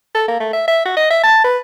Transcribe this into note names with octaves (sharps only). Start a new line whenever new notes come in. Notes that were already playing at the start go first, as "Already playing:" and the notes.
A4
A#3
A3
E5
E5
F#4
D#5
E5
A5
B4